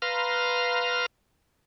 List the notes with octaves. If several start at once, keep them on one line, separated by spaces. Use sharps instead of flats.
B4 F5 A#5 C6 F6